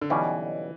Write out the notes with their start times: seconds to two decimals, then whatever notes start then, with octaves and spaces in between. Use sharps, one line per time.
0.01 D3
0.10 B1 B2 E3 G3 C#4